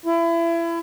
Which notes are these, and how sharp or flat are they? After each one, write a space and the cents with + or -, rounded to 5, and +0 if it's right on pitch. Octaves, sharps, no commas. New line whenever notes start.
E4 +30